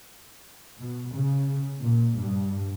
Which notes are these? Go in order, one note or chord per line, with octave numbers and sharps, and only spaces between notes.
B2
C#3
A#2
G2